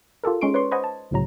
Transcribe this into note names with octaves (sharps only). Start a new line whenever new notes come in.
F4 G4 A4 A#4
G#3 C#4 D#4 C6 C#6 D7
B4 C#5 D5 C6 C#6
C5 D#5 F#5 G#5 B5 G#6
A5
C2 A2 C#3 F#3 A#5